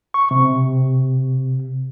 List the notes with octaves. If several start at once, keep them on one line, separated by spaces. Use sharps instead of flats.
C#6
C3